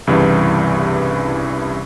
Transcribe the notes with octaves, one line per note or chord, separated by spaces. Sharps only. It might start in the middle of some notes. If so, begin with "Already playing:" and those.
C2 G2 C#3 E3